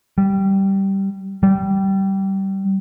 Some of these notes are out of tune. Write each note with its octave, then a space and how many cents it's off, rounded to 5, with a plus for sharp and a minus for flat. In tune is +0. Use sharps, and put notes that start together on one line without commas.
G3 -10
G3 -20